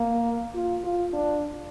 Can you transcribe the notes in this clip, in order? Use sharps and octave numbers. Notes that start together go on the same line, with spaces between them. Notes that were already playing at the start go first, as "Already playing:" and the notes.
Already playing: A#3
F4
F4
D4